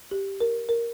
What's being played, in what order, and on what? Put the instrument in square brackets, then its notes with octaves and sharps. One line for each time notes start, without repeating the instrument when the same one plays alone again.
[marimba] G4
A#4
A#4